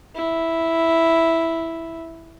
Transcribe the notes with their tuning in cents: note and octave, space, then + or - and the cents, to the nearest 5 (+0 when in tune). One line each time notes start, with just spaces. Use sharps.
E4 +0